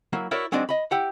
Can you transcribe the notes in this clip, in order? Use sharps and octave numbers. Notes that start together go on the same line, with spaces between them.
F#3 A#3 E4
E4 F#4 A#4 C#5 D5 E5
F#3 G#3 C4 D4 D#4 D5
D#5 B5
E4 G4 F#5